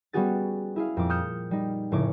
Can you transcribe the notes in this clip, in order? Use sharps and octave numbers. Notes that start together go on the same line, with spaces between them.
G3 B3 C#4 F#4 G#4 A6
E4 G#4 F5
F2 A#2 D6
D#6 F6 G6 C#7 E7
G3 D#4
F1 A2 C#3 C#5 D6